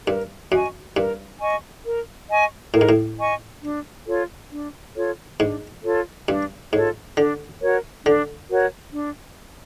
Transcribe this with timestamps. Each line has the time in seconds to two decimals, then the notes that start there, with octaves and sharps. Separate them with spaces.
0.07 G2 A#4
0.52 F#2 D#5 G#5 C#6
0.96 G2 A#4
1.40 D#5 G#5 C#6
1.85 A#4
2.29 D#5 G#5 C#6
2.74 A2 A#4
2.81 G#2
2.89 A2
3.18 D#5 G#5 C#6
3.62 D4
4.07 F4 A4 C#5
4.51 D4
4.95 F4 A4 C#5
5.40 G#2 D4
5.84 F4 A4 C#5
6.28 G2 D4
6.73 G#2 F4 A4 C#5
7.17 D3 D4
7.61 F#4 A#4 C#5
8.06 D3 D4
8.51 F#4 A#4 C#5
8.95 D4